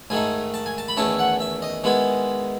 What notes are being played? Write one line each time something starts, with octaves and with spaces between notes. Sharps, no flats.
G#2 D#3 A3 D#4 G#5
A5
G#5
A5
B5
E2 D#3 A3 C#4 E4 A5
F#5
E5
D#5
D#3 G#3 B3 E4